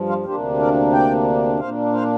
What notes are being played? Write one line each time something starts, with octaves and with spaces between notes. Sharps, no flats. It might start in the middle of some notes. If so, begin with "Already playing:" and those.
Already playing: G2 F3
C5 F5
D2 C3 A#3 D4 G4 C5
A#4 D5
D5 G5
A#2 A#3 D4 C5 F5
C5 F5